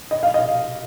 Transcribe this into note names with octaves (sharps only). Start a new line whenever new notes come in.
D#5
F5
D#5